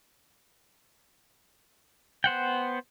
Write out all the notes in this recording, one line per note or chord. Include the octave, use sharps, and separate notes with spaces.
B3 C5 F#5 G5